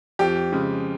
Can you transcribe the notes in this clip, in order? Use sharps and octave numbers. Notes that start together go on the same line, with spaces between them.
F2 G4
C#3 G#3